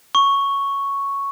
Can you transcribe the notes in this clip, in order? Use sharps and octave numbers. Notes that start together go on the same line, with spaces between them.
C#6